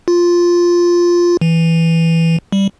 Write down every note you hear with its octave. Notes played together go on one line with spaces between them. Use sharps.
F4
E3
G3